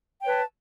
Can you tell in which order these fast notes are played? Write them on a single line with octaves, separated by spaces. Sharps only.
G5 C#5 B4 A5